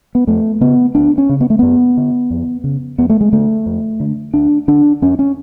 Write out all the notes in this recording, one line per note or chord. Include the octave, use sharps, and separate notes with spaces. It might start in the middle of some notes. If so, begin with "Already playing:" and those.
B3
F2 A3
C#3 B3
D2 D4
C#4
C#3
B3
A3
F#2 B3
D3
F2
C#3
F2 B3
A3
G#3
D3 A3
F2
D3
D2 D4
D3 D4
F2 C#4
C#4